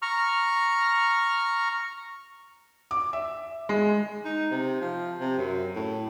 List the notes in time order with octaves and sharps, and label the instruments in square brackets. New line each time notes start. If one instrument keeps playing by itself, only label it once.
[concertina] A#5 C#6 F6
[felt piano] D6
E5
G#3
[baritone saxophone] D#4
C3
F3
C3
F#2
A2